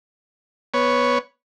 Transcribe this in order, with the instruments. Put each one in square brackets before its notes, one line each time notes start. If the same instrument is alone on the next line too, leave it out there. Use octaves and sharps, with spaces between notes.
[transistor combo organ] B3 C#5